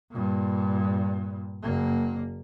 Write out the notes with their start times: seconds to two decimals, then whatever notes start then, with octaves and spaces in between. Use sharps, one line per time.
0.11 G2 A#2
1.62 F#1 A#3